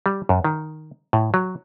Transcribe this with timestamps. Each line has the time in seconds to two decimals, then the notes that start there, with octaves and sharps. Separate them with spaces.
0.06 G3
0.29 F#2
0.44 D#3
1.13 A2
1.34 F#3